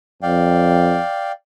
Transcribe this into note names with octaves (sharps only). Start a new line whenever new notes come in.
F2 D5 F5 G5